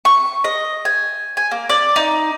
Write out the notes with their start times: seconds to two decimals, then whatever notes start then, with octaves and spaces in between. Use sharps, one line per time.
0.05 C#6
0.44 D#5
0.85 G#5
1.37 G#5
1.51 A#3
1.69 D5
1.96 D#4